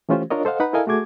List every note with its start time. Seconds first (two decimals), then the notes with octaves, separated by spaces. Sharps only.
0.09 E3 A3 C#4 F4 G4 C5
0.30 D4 F4 A#4 C#5 D#5
0.45 A4 C5 D#5 F5 F#5
0.60 D#4 B4 F#5 B5
0.73 E4 A4 A#4 D#5 F5 G#5
0.87 A3 F#4 G#4 D6 G#6